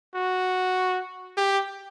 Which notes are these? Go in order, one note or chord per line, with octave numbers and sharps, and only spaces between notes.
F#4
G4